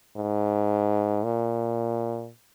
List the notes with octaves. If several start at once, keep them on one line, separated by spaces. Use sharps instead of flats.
G#2
A#2